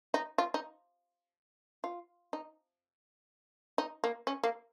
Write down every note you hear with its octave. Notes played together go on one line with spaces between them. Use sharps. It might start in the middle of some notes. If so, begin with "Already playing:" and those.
D#4
F4
D#4
F4
D#4
D#4
A#3
C#4
A#3